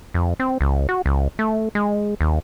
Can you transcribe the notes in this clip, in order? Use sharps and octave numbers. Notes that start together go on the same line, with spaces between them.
F2
C4
C#2
F#4
C#2
A3
G#3
D#2